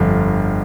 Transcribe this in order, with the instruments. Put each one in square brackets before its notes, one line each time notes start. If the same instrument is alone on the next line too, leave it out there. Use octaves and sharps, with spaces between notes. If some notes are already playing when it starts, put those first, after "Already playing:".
Already playing: [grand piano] G1 F2 D3